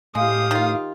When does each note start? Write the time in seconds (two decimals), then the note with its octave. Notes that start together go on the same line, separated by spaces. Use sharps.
0.15 A2 G#3 G4 F5 D#6
0.51 D#3 F4